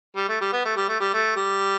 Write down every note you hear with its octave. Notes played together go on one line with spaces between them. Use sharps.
G3
A3
G3
B3
A3
G3
A3
G3
A3
G3